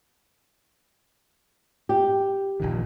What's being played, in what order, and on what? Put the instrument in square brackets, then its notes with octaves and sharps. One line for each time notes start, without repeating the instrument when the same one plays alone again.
[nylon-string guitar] G4
[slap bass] A#1 A#2 D#3